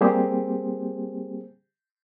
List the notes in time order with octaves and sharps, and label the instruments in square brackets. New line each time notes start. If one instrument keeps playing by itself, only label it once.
[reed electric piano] G3 A#3 C4 G4 G#4 C5